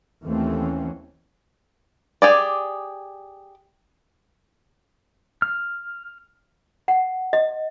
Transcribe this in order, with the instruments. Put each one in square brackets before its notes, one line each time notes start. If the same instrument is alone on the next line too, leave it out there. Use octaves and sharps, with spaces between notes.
[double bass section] D#2 E3 A3 C4 C#4
[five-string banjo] G4 G#4 D5
[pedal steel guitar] F6
[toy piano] F#5
D#5